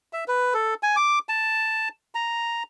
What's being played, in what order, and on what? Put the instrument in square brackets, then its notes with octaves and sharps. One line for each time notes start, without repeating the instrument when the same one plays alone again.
[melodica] E5
B4
A4
G#5
D6
A5
A#5